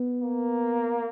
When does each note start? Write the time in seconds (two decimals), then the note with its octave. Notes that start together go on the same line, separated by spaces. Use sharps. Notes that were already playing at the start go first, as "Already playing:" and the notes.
Already playing: B3
0.21 A#3